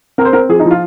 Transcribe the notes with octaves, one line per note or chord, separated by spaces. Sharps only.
C4 A#4
C5
C4 A#4
F3 G#4
D#4
F3
F4